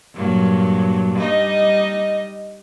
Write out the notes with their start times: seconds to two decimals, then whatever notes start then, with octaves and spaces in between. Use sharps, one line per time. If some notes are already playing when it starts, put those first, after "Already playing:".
0.14 G2 A#2 F#3
1.17 G3 D#4 D#5